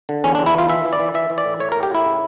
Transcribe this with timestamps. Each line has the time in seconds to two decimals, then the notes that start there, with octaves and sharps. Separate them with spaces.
0.09 D3
0.24 E2 C#4
0.35 D4
0.39 E2
0.46 E4
0.55 E3 F4
0.69 E3 E5
0.85 E3
0.93 D5
1.00 E3
1.14 E3 E5
1.30 E3
1.38 D5
1.45 A2
1.60 A2 C#5
1.72 A#4
1.75 A2
1.83 G4
1.90 A2 E4
2.06 C#3